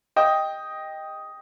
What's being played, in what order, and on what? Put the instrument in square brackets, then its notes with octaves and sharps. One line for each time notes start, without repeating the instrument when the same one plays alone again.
[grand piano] D#5 G5